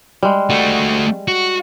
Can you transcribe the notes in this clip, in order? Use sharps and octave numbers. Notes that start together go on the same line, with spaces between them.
G3 G#3
A3 F#4
F#4